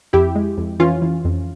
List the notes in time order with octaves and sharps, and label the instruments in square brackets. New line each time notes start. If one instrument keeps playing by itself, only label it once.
[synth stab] F2 E4 G4
G#3
F2
E3 C#4 F4
E3
F2